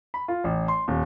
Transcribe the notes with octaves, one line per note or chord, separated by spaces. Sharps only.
B5
F4
A1
C6
D#1